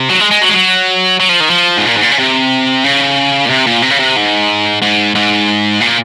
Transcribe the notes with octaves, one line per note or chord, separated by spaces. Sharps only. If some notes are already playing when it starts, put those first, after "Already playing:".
Already playing: C3
F#3
G#3
G#3
F#3
G#3
F#3
F#3
F3
D#3
F3
G#2
A#2
G#2
A#2
C#3
C3
C#3
A#2
C3
A#2
C3
C#3
C3
G#2
G#2
G#2
A#2